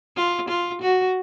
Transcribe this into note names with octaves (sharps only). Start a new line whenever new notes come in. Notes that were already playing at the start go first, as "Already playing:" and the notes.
F4
F4
F#4